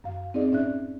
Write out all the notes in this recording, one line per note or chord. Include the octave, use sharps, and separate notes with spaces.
F#2 F5
C4 D#4 G#4 D5 D#5
A2 C#4 D5 E5 F#6